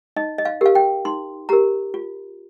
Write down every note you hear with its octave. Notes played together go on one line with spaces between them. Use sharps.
D#4 D#5
D#5
F5
G4 A#4 F5
G5
D#4 C6
G4 A#4 A#5
F4